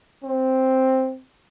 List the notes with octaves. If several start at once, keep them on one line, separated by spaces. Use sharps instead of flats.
C4